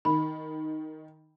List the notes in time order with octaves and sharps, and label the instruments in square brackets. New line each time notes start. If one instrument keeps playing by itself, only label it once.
[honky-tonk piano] D#3 [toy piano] B5